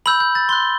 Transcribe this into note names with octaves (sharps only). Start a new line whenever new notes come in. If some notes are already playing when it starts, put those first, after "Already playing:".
B5 E6 G6 F#7
G6
A6
C6 F#6 G7